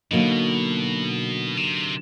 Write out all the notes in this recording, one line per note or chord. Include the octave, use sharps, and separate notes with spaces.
B2 D3 F#3 A#3 D#4
C3